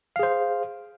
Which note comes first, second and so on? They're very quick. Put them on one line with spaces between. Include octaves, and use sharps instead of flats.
F5 G#4 C5